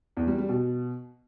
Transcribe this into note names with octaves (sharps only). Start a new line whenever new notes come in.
E2
G3
G3
B2